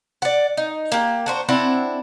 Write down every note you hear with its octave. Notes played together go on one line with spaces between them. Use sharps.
D5 F#5
D#4
A#3 G4
D4 F#4 C5
C4 D4 E4 F#5